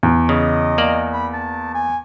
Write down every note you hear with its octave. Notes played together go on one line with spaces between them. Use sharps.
E2
C#3 D#5
A#3 D5
B5
A5
G#5